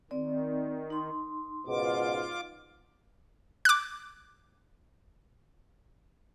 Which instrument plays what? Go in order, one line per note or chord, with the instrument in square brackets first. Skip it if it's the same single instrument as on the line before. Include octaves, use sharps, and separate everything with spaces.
[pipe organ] D#3 [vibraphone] C4 D5
[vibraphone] D#4 C6
[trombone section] C#2 G#2 B2 [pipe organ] F4 D6
[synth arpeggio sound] D6 F#6